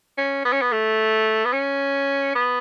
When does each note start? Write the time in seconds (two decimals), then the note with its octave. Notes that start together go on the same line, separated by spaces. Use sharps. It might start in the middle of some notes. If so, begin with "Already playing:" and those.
0.18 C#4
0.45 B3
0.52 C#4
0.61 B3
0.72 A3
1.45 B3
1.53 C#4
2.35 B3